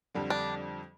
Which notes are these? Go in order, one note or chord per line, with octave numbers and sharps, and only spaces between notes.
F2 D3 G3
D4